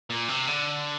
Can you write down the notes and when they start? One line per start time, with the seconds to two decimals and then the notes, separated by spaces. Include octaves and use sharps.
0.10 A#2
0.29 C3
0.47 D3